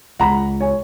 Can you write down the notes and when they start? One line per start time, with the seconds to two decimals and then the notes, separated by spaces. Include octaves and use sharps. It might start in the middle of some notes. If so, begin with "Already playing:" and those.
0.20 C#2 F#5 A#5 B5
0.61 C#5 G#5